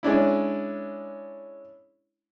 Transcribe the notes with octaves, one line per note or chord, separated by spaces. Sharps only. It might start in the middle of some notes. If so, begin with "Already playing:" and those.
G#3 C#4 D4 E4